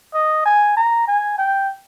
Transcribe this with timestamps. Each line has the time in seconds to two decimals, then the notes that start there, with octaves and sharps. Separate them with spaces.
0.14 D#5
0.46 G#5
0.77 A#5
1.08 G#5
1.38 G5